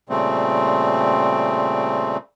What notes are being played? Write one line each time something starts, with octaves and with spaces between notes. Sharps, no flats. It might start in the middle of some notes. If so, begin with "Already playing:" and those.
A#2 C#3 G3 A3 C4